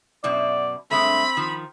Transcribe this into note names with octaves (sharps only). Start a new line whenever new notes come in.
F#2 B2 E4 D5
G2 G#3 A3 C4 B5
D#3 F3